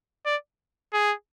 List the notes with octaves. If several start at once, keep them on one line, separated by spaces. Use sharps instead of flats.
D5
G#4